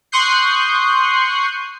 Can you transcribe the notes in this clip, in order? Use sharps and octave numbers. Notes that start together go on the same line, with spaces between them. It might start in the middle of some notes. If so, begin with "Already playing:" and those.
C6 C#6 D#6 F#6 G6 C7